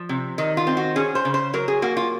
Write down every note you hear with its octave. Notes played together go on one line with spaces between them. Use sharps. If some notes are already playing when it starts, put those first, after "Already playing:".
Already playing: F3
C3
D#3 D#4
F4
C4
F#4
C#4 G#4
C5
C#3
C5
F#3 A#4
G#4
A#3 F#4
F4